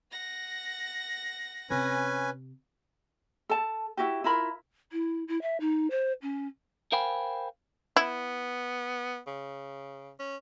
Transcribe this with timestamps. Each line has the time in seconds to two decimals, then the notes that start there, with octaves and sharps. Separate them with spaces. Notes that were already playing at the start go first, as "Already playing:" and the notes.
0.11 F#5 A#6
1.70 C3 C#4 B4 G#5
3.49 A4 A5
3.97 E4 F#4 G4
4.24 E4 F4 A#4 B5
4.92 E4
5.27 E4
5.41 E5
5.60 D#4
5.90 C5
6.22 C#4
6.92 A#4 C5 F5 G5 G#5 B5
7.96 B3 E4
9.27 C#3
10.19 C#4